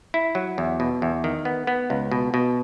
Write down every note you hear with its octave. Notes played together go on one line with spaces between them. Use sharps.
E4
F#3
E2
B2
E2
D#3
B3
B3
C#2
B2
B2